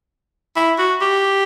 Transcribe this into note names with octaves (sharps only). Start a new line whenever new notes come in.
E4
F#4
G4